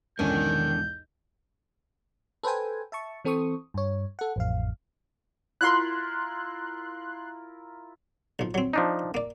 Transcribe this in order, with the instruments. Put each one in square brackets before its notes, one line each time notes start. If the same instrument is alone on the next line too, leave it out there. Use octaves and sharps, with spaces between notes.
[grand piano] B1 E2 G#2 [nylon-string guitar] D3 C#4 [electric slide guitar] D#3 A#4 [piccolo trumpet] G6
[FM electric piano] A4 B4 C5 G5 G#5
E5 A5 C#6
E3 C4 A4 C5 C#6 D#6
G2 C#5
A4 F#5
A1 F2 F5
[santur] E4 F4 A#4 [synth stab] C6 F#6
[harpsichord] B1 F3
F#3 C4
[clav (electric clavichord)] F3 D4 D#4
[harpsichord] A#3 D5